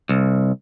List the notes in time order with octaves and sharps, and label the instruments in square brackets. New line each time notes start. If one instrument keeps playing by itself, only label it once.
[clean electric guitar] C2